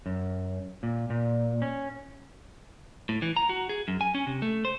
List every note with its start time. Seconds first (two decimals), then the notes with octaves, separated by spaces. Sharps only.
0.06 F#2
0.83 A#2
1.10 A#2
1.62 C#4
3.09 A2
3.22 E3
3.37 A#5
3.49 F#4
3.69 G#4
3.88 F#2
4.01 G#5
4.14 C#4
4.27 C3
4.42 A3
4.65 C5